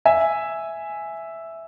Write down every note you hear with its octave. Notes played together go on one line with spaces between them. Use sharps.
E5 G#5